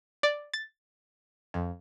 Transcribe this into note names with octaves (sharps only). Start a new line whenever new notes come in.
D5
A6
F2